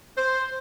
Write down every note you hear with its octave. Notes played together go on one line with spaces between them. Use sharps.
C5